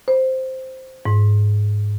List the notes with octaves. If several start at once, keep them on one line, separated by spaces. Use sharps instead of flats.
C5
G#2